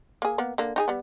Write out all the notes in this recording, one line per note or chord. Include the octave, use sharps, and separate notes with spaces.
A#3 G#4
A#3 B3
D3 A#3
D#4 G4 G#4
G3 B3